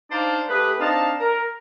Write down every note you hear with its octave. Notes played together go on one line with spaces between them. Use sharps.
D4 D#4 C5 D5 F5 A5
A3 G4 G#4 B4
C4 D4 D#4 F5 A5
A#4